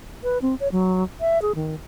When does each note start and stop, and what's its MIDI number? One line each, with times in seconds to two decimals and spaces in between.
0.23 0.38 71
0.42 0.55 60
0.60 0.68 73
0.72 1.04 54
1.21 1.41 76
1.42 1.52 68
1.55 1.75 51